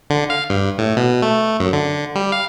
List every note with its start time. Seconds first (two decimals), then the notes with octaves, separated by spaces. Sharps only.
0.10 D3
0.30 F5
0.50 G2
0.78 A2
0.97 B2
1.22 A3
1.60 F#2
1.73 D3
2.15 G3
2.32 F5